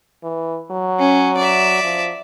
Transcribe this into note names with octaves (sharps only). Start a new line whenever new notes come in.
E3
F#3
C#4
D5 E5
F3